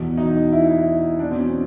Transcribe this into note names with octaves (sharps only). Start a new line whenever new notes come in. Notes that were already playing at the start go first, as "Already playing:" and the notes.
Already playing: E2 B2 F#3
D#4
E4
E4
E2 B2 F#3 D4
C4
C#4